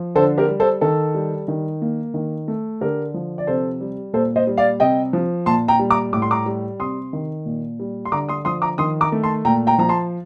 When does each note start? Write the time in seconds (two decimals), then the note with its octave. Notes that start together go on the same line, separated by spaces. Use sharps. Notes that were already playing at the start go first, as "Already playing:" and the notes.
Already playing: F3
0.15 D3 A4 C5
0.38 G4 A#4
0.49 G3
0.60 A4 C5
0.81 D#3 A4
1.15 G3
1.48 D#3
1.82 A#3
2.14 D#3
2.48 A3
2.81 D3 G4 A#4
3.14 F3
3.38 D5
3.47 C3 A4 C5
3.81 G3
4.13 A#2 A4 C5
4.36 C5 D#5
4.47 G3
4.57 D5 F5
4.80 C3 D#5 G5
5.13 F3
5.46 A#2 A5 C6
5.68 G5 A#5
5.79 G3
5.90 A#5 D6
6.13 A2 D6
6.22 C6
6.31 A#5 D6
6.46 G3
6.80 C3 C6 D#6
7.13 D#3
7.46 A#2
7.80 G3
8.05 C6
8.12 D3 A#5 D6
8.29 C6 D#6
8.45 F3 C6 D#6
8.62 A#5 D6
8.78 D#3 C6 D#6
9.01 A#5 D6
9.12 A3
9.23 A5 C6
9.45 A#2 G5 A#5
9.67 G5 A#5
9.79 F3 A#5
9.89 A5 C6